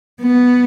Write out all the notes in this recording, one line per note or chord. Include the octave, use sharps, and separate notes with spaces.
B3